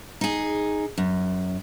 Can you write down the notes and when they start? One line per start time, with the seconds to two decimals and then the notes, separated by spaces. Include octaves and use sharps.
0.21 D#4 G#4
0.98 F#2